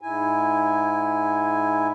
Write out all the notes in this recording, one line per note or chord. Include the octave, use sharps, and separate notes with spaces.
G#2 E4 G#5